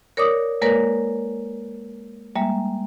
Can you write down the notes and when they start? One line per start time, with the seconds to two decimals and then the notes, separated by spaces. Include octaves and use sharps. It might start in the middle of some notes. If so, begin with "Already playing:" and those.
0.17 A#4 C#5 D5 D6 D#6
0.62 G#3 A#3 A#4 B4 C#5 D5
2.36 G3 G#3 A#3 E5